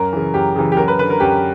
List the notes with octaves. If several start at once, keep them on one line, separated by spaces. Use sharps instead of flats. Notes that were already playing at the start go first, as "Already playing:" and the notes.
Already playing: F#2 A#4
C#3 E3
F#2 G4
C#3 E3
G4
F#2 A#4
B4
D3 B4
A#4
F#2 G4